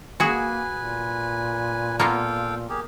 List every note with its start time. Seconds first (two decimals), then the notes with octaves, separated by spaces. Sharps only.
0.20 A#3 F#4 G#4 B4 G#5
0.74 A#2
2.00 A#3 B3 F4 A4 F5 G5
2.69 G4 G#4 A#4